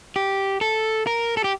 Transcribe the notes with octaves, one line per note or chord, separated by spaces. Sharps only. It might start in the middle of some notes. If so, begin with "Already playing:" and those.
G4
A4
A#4
A4
G4